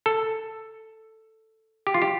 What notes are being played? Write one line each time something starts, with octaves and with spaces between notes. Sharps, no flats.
A4
G4
F4
G4